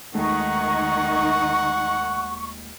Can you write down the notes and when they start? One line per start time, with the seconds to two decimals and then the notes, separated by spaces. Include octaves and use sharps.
0.15 D#2 D#3 G#3 A3 D#4 F#5 C#6